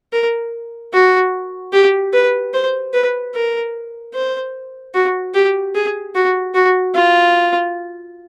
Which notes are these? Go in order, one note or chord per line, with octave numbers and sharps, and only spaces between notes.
A#4
F#4
G4
B4
C5
B4
A#4
C5
F#4
G4
G#4
F#4
F#4
F4